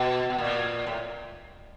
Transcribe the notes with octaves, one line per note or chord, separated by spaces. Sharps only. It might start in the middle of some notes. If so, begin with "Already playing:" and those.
Already playing: B2
B2
A#2
A2